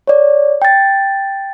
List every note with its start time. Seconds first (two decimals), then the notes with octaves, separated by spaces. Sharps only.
0.07 C#5 D5
0.62 G5 A6